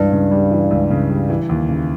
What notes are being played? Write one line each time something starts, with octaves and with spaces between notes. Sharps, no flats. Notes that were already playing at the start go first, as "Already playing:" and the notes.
Already playing: C#2 G2 E3
C#3
G3
E3
C#2
C#3
G3
E3
D#2
C#3